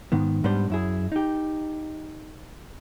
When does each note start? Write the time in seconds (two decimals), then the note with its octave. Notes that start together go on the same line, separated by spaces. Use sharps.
0.12 G#2 D#3 B3
0.44 G#2 G3 B3 D4 C5
0.70 F#2 E4 G#4
1.12 D#4 G4